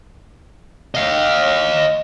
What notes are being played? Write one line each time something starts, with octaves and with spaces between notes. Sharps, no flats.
D#5 F5